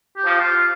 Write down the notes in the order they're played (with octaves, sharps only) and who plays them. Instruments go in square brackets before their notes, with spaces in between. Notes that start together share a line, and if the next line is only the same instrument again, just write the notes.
[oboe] G4
[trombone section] F3
[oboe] F4
F4